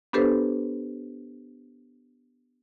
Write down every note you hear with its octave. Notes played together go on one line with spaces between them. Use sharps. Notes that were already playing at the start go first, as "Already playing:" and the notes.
B3 D4 G4 A4 B4 C5